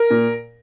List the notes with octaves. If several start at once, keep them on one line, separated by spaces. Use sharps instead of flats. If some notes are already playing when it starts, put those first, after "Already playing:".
Already playing: A#4
A#2